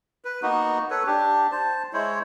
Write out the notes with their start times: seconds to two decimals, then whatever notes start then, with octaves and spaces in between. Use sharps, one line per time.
0.25 B4
0.42 A#3 B3 D#4 F#4
0.91 A4 B4 C#5
1.07 D4 G4
1.51 C5 A5
1.93 G#3 E4 C5 C#5